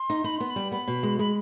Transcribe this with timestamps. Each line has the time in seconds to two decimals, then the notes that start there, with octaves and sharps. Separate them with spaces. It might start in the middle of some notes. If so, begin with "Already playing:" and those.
Already playing: C6
0.10 D#4
0.24 D#4 B5
0.38 B3 C6
0.50 B5
0.56 G3
0.72 B3 B5
0.88 B2
1.03 G#3
1.19 G#3 B5